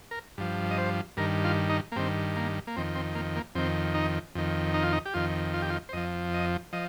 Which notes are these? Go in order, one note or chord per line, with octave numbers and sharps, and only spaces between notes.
A#4
G2 F3
D#5
C5
G2 D#3 A#4
F4
D#4
A#3
G2 D#3 C4
A#3
A#3
F2 D#3 C4
C4
A#3
A#3
F2 D#3 C4
D#4
F2 D#3
D#4
F4
D#4
G4
F2 D#3 F4
F4
G4
F4
C5
F2 F3 D#5
D#5
F3 D#5